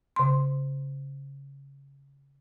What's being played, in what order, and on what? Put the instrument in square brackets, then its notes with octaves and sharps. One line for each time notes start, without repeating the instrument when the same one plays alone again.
[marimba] C#3 C6